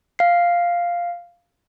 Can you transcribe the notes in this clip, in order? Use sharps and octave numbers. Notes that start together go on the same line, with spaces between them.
F5 C7